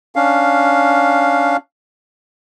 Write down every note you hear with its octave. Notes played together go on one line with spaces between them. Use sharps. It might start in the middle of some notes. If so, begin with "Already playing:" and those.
C#4 D4 F5